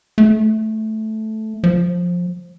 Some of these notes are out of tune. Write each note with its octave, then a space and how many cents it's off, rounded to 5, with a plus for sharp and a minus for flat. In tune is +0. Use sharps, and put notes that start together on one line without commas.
A3 -10
F3 +15